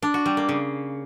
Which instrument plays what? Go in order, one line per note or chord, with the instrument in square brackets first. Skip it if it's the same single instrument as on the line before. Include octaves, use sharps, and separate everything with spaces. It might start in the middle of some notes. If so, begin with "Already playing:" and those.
[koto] D4
F#4
G3
A#3
C#3